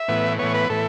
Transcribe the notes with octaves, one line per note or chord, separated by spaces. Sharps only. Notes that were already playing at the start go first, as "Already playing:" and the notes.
Already playing: E5
A2 E3 B3
A2 E3 B3 C#5
B4
A2 E3 A4